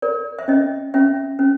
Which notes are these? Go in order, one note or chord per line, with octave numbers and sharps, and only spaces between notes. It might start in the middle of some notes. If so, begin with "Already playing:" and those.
A#4 D5
E5
C#4 D#5
C#4 E5
C#4